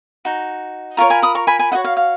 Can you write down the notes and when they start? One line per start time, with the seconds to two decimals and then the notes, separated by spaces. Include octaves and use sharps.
0.25 D#4 F#4
0.97 F4 A#4 C#5 A#5 C#6
1.10 G#5 B5
1.22 B5 D#6
1.35 A#5 C#6
1.47 G#5 B5
1.59 G#5 B5
1.72 D#4 F#4 C#5 D#5 F#5
1.84 F5
1.97 F5